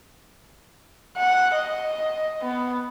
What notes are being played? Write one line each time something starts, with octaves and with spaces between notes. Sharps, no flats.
F#5
D#5
B3